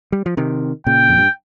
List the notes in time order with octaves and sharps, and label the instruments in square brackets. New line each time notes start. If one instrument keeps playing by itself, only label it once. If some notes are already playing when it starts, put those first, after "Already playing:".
[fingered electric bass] G3
F3
C3 D#3
[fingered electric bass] A#2 C#3 [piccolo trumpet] G5
[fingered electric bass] F2
G2